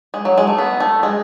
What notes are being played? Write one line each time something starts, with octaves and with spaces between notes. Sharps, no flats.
G#3
F#3
G#3
A3
B3
A3
G#3